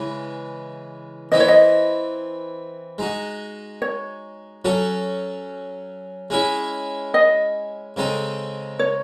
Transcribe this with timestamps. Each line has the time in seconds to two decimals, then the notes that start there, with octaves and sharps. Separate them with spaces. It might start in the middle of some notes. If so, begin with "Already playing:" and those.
Already playing: C#3 E3 G#3
1.32 E3 C4 E4 D#5
1.40 C#5
1.48 D#5
2.98 G#3 D#4 F#4
3.82 C#5
4.65 F#3 C#4 F#4 A4
6.30 G#3 C#4 E4 G#4
7.14 D#5
7.96 C#3 G#3 C4 D#4 A4
8.79 C#5